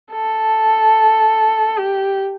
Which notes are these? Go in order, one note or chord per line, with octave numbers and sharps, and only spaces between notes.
A4
G4